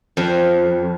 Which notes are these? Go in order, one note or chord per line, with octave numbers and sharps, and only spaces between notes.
F2